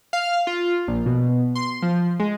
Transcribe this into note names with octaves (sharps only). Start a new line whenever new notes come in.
F5
F4
A#1
B2
C6
F3
G#3